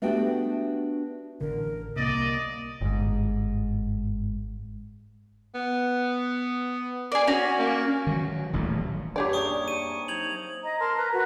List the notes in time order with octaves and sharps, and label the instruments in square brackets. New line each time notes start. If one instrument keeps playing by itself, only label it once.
[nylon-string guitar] A3 B3 D4 F#4 G4 G5
[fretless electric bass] A1 D3 [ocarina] A#4
[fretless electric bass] C2 C3 [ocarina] A#3 [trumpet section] D5 D#5
[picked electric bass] G1 G#2
[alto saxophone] B3
[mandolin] G#4 D5
C#4 F#4
[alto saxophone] A#3
[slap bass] D#3 F3 F#3
D#1 A1 B2 F#3
[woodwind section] F#2 D#4 C#5 [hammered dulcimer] G3 D4 [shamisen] G4 G#4 D5
[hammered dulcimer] A#3 E5 [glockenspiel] C#6 D#6
[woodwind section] C#6 [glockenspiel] D#7
[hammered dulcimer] C4 A#4 G#5
[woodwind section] F#3 D#4 [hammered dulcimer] D#5 [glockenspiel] G#6 F7 F#7
[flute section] D#5 A#5
A#4 A5 C6
B4 A#5
F#4 A#4 B4